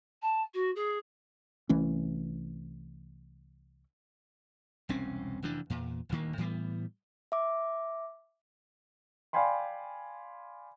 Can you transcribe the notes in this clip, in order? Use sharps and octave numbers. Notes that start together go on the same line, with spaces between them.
A5
F#4
G#4
C2 E3 A3 C#4
E1 C2 C4 C#4
F1 F#2 E3 D4
E2 A#2
D#1 D2 D#3 A#3
A2 E3 G3 B3
E5 D6
D5 F5 G5 G#5 B5 C6